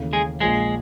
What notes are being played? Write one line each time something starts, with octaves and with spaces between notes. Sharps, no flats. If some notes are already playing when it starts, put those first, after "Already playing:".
Already playing: D#2 C#3 E3 A3
G#3 G#4
A#1 A#2 F3 G#3 G#4